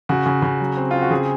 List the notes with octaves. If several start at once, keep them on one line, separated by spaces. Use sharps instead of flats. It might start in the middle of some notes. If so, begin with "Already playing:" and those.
C#3 F#4
C#3
C#3
F#3
C4
C4 F4
F#4
C#3 G#4